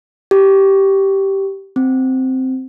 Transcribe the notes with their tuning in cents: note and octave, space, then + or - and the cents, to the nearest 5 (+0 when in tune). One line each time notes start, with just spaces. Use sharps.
G4 -10
C4 -5